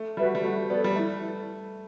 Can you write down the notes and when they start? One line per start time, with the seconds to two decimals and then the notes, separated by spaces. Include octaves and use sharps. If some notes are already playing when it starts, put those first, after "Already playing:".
Already playing: A3
0.17 G3 F#4 B4 E5
0.35 G3
0.44 A3 F#4
0.69 B3 A4 D5
0.84 G3
0.96 A3 E4